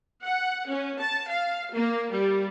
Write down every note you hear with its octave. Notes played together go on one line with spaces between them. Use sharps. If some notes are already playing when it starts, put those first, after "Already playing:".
F#5
C#4
A5
F5
A#3
G3